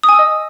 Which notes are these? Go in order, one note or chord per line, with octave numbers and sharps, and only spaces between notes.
D#6
G#5
E6
D#5